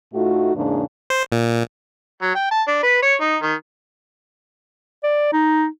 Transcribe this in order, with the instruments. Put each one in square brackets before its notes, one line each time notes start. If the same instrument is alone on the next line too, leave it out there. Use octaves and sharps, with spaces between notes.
[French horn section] A2 A3 D#4 F4 F#4
E2 G#2 C#3 E3 A#3 D4
[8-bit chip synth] C5
A#2
[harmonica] F#3
G5
A5
D4
B4
C#5
D#4
D#3
[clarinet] D5
D#4